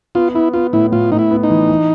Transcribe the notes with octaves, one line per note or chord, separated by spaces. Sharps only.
B3 F4
B3 E4
B3 F4
A2 E4
A2 F4
A2 D#4
E4
B3
D#4
E3
E3